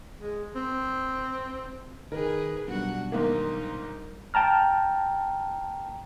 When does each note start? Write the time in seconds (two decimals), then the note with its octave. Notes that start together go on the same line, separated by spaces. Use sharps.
0.19 G#3
0.55 C4
2.12 D#3 G#4 A#4 B4
2.68 B1 G3 D4 F#4 F#5
3.12 G#2 D#3 A#3 D#4 A#4
4.34 G5 A5 A#5 F6